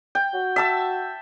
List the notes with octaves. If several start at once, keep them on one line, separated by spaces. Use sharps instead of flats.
G5
F#4
E5 A5 E6